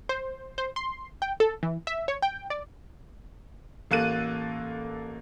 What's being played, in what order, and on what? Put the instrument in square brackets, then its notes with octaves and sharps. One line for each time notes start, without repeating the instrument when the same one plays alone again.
[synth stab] C5
C5
C6
G5
A4
E3
E5
C#5
G5
D5
[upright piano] A1 A#3 A4 F#6 D#7